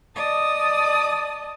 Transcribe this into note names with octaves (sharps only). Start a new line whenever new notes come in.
D5 D#5 A5 D#6